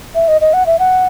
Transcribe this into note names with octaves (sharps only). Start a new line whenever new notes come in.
E5
D#5
D#5
F#5
E5
F#5